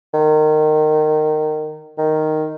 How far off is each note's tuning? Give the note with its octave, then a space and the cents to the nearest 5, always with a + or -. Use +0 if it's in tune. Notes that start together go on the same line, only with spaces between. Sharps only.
D#3 -20
D#3 -5